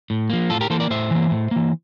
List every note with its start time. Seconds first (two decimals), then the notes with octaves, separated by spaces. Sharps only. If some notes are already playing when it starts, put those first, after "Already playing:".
0.10 A2
0.30 F3 A#3
0.50 A2 F4 A4
0.61 G4 A#4
0.70 E3 A#3 A4 C5
0.80 A#4 D5
0.90 A2 C5 E5
1.11 E3 A#3
1.31 A2
1.51 E3 A#3